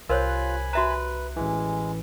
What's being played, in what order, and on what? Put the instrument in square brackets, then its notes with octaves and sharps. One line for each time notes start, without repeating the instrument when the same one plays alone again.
[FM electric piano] C2 F#6 [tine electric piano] F4 [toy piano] A#4 C5 C#5 [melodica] G#5 B5
[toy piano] F#4 E5 A#5 [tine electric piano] B4
[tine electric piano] A1 E3 [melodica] G#3